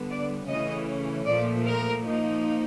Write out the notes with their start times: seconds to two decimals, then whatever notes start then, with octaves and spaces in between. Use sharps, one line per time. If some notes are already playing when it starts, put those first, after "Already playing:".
Already playing: D3 G3 B3
0.10 D5
0.48 C#3 E3 A3 C#4 D#5
1.25 A#2 F3 A3 D5
1.65 A#4
2.03 F3 A#3 D#4